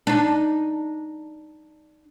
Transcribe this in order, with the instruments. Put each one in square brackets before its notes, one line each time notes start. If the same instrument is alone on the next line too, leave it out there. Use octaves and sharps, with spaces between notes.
[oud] D4 D#4